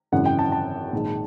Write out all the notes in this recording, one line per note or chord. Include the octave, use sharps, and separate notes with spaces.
G#1 F#2 C#3 E3 F#5
G5
A5
A5
A#1 G#2 D#3 G#3